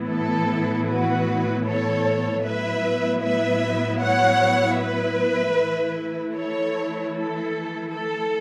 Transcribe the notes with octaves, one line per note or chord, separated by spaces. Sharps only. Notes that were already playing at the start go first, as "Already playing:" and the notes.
Already playing: A2 E3 B3 E4
A4
F#4 B4
A4 C#5
A2 F#3 B3 E4 B4 E5
B4 E5
C#5 F#5
B4 E5
E3 A3 E4
A4 C#5
A4
A4